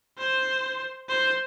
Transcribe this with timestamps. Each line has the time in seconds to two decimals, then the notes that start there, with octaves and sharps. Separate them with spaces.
0.19 C5
1.09 C5